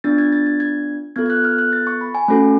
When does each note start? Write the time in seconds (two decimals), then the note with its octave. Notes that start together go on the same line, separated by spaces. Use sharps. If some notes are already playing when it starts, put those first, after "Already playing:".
0.04 B3 D4 F4 A6
0.18 G#6
0.32 A6
0.46 G#6
0.60 G#6
1.16 B3 F4 A4 G#6
1.26 G#6
1.30 F#6
1.44 F6
1.58 F#6
1.73 A6
1.87 C#6
2.01 B5
2.15 G#5
2.28 A3 C#4 F#4 A4